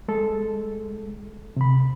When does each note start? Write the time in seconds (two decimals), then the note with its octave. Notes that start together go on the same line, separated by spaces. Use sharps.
0.08 G#3 A4
1.56 C3 B5